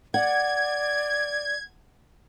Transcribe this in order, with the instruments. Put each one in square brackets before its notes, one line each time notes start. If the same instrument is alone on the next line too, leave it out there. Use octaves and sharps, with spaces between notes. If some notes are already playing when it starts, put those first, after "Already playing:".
[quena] D5 [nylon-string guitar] F#5 [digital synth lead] G#6